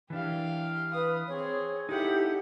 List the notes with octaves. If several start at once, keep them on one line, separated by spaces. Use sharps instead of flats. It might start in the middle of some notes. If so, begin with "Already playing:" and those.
E3 D4 G4 F5
B4 D#6
C4 G#4 C#5
D#4 E4 G4 A4 F#5